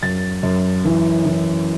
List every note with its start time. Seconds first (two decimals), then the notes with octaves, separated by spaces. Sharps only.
0.03 F#2 A6
0.43 F#2
0.85 E3
1.25 E3